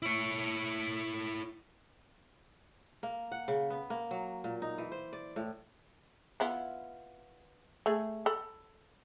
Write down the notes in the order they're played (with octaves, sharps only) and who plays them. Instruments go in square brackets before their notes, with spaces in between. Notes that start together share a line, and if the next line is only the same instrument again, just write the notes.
[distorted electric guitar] E4 C#5
[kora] A#3
F#5
C#3
B3
A#3
F#3
A#2
D#4
E3
C5
D5
A2
[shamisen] B3 E4 F4
A3 G#4
A4 B5